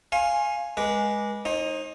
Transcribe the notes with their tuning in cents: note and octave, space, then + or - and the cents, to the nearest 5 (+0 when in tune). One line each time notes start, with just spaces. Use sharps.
F5 -5 G#5 +0 C6 +45
G#3 +0 B4 -30 D6 +0
D#4 +0 C5 +45